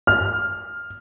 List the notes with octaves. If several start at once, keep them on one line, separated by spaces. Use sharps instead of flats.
F6